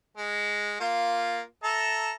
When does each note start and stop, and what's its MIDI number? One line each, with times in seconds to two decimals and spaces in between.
0.17 0.80 56
0.80 1.42 58
0.80 1.42 65
1.64 2.12 69
1.64 2.12 76
1.64 2.12 82